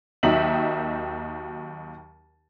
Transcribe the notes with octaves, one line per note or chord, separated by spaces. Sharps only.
D#2 D#3 F#3 D#4 E5 F#7